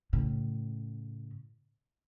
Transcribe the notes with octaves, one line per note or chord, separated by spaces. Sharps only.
A2 C#3